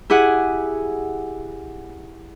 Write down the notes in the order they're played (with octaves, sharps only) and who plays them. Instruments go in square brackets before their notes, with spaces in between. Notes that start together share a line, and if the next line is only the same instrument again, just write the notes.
[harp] E4 G4 G#4 F#5